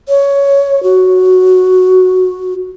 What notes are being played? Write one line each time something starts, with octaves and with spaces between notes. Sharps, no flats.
C#5
F#4